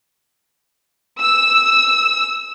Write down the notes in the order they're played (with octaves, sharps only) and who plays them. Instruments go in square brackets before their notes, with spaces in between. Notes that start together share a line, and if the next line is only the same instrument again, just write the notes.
[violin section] E6